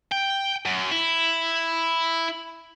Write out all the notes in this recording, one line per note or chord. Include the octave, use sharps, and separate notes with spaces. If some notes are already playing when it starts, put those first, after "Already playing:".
G5
F#2
E4